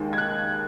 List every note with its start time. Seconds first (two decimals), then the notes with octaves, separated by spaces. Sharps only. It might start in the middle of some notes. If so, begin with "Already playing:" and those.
Already playing: D#2 D#3 G#3
0.13 G#6
0.18 F#6